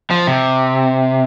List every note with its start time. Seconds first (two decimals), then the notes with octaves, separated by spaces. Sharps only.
0.11 F3
0.27 C3